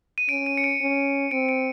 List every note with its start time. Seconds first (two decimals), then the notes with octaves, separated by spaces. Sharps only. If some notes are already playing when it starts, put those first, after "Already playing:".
0.18 D#7
0.29 C#4 D7
0.46 D#7
0.57 C#7
0.64 D7
0.81 C#4
1.31 C4 D7
1.49 D7